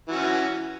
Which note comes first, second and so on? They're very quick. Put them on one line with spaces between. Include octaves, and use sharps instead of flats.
E3 F#4 C#4